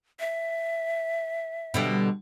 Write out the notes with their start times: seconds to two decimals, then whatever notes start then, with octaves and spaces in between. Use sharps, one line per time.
0.19 E5
1.74 B2 D3 G3